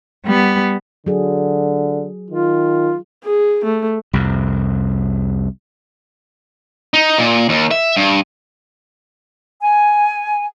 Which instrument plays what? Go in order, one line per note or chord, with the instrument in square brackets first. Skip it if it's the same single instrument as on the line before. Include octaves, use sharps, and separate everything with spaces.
[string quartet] G3 B3
[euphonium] D3 [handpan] F#3 G#4
[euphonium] D#3 [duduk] F4
[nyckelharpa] G#4
A3
[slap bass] C2 F2 C3
[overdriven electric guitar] D#4
A#2
D#2
E5
G2
[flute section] G#5